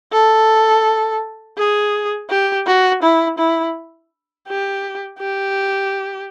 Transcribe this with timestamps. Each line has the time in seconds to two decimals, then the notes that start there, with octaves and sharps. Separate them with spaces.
0.12 A4
1.58 G#4
2.29 G4
2.67 F#4
3.03 E4
3.38 E4
4.47 G4
5.19 G4